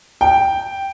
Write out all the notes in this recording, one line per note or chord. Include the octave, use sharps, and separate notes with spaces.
G5